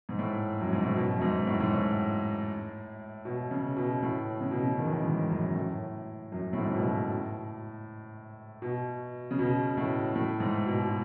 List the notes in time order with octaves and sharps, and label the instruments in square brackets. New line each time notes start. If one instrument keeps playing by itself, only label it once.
[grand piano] G#2
A2
F#2
G#2
A2
B2
F#2
G#2
A2
G#2
A2
B2
C#3
B2
A2
C#3
B2
C#3
D#3
E3
D#3
G#2
F#2
A2
F#2
A2
G#2
C#3
B2
A2
B2
C#3
B2
A2
A2
G#2
B2
B2